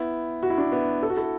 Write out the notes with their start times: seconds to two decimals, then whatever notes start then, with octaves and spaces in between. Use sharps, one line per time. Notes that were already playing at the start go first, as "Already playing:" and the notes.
Already playing: B3 E4
0.43 F#4
0.50 E4
0.57 D4 F#4
0.72 B3 E4
1.03 A4
1.10 F#4
1.17 E4 A4